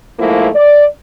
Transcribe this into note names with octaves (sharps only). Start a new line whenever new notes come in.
G#2 F3 A3 A#3 E4 F4
D5